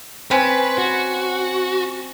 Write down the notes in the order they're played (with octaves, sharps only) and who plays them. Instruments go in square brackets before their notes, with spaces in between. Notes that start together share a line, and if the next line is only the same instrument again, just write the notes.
[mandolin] C4 C#4 [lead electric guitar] B4
[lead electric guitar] F#4